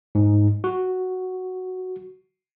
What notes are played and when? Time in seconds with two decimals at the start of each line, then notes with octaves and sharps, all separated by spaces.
0.15 G#2
0.64 F#4